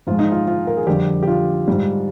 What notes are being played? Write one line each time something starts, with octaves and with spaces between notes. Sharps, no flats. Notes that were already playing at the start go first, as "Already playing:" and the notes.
G#2 F3 G#3 F4
D#4
F4
F4
A#4
G#4
F2 D3 G3 G4
G4
F4
G#2 G3